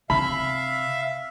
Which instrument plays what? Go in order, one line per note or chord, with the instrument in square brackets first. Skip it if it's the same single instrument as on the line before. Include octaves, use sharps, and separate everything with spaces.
[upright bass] C3 [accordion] E5 F5 [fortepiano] B5